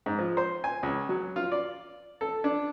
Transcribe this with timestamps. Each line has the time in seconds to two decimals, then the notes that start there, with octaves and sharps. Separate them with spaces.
0.06 G#2
0.19 F3
0.37 C5
0.64 G#5
0.83 C#2
1.09 F#3
1.36 F4
1.52 D5
2.21 A4
2.44 D4